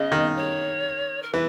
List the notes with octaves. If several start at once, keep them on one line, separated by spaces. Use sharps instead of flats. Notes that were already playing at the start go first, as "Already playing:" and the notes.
Already playing: C#3 D#5
D#3
C#5
A#4
E3 B4